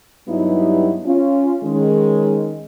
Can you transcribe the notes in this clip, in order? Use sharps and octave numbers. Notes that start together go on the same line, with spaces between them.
G2 F#3 G3 B3 D#4 E4
C#4 F4
D#3 G#3 C#4